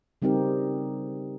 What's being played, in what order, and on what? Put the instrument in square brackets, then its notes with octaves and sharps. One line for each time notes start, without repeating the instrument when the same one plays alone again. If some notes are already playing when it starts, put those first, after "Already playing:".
[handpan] C#3 G3 C4 D#4 G4 A#4